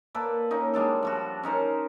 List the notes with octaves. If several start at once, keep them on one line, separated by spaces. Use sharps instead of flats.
A#3 A4 B4 D5
A#3 C#4 D#4
G3 G#3 D4 A4
F3 G3 F#4
C#4 D#4 A#4 C5